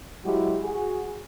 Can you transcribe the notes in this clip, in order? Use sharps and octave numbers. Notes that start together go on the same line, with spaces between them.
F#3 G#3 E4 F#4 G4
F#4 G#4